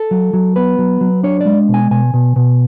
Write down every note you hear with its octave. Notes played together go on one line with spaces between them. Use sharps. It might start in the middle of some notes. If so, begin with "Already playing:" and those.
Already playing: A4
F#3
F#3
B3 B4
F#3
F#3
D4 C#5
G#3 D5
B2
G#5
B2 G#5
B2
B2